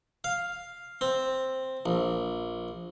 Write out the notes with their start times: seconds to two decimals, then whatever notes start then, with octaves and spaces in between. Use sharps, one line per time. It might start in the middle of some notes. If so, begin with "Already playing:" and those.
0.24 F5
1.01 C4
1.86 A#1